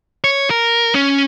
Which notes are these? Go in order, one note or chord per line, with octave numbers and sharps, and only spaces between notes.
C#5
A#4
C#4